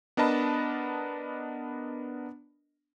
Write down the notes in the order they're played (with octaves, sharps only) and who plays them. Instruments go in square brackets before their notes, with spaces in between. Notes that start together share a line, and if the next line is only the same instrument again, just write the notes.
[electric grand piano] B3 D4 A#4 D#5 A5 B5